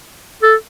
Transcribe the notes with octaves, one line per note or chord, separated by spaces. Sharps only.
A4